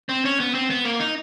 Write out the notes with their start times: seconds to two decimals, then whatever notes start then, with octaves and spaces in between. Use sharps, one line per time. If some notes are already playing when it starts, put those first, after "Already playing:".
0.09 C4
0.25 C#4
0.40 B3
0.55 C4
0.70 B3
0.85 A#3
1.00 D#4